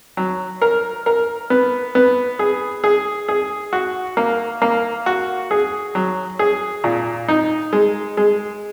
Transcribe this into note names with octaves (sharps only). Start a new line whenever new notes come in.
F#3
A#4
A#4
B3
B3
G#4
G#4
G#4
F#4
A#3
A#3
F#4
G#4
F#3
G#4
A#2
D#4
G#3
G#3